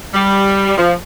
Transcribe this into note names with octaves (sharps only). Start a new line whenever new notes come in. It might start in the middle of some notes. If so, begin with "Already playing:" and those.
G3
F3